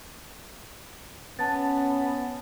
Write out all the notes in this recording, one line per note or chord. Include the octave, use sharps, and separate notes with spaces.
B3 C#4 A5 A6